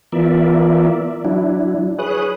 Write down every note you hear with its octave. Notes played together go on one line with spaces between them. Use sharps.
E3 B3 F4 A#4 D5 E5
F#3 D4 E4
G#4 B4 C#5 D#6 F#6